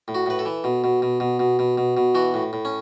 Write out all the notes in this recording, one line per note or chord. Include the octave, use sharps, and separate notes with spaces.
A2
F#4
A2 B4
A4
E3
B2
B2
B2
B2
B2
B2
B2
B2
E3 F#4
A2
A2
C#4